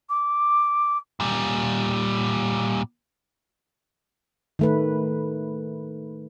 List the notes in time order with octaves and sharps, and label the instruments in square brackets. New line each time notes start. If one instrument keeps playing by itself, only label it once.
[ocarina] D6
[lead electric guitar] A#2 G3
[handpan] D#3 A3 B4